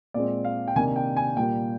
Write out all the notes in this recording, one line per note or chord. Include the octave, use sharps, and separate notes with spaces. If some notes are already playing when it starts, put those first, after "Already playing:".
A#2 G#3 C4 D5
F5
G5
C3 D#3 A#3 D4 G#5
G5
G#5
A#2 G3 A#3 G5